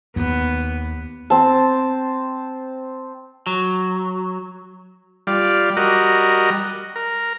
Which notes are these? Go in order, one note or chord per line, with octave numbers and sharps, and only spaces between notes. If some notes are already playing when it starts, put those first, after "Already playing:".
D#2 B3
C4 A5
F#3
G3 F4 D5
G3 F#4 A#4 D#5
A#4